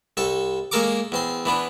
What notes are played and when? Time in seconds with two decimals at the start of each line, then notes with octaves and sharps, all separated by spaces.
0.17 C2 A4 C#6
0.71 G#3 A#3 A4 A#4 C#6 D6
1.12 E2 C4 C6
1.45 E3 B3 D4